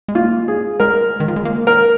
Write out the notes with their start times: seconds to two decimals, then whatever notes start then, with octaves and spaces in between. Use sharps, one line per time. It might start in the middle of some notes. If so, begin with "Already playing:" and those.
0.08 G#3
0.15 A#3 F4
0.48 G#4
0.80 G#3 A#4
1.20 D#3
1.28 F3
1.36 G#3
1.45 A#3
1.67 A#4